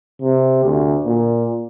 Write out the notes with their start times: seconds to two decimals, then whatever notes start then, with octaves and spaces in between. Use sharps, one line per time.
0.22 C3
0.64 D2
1.05 A#2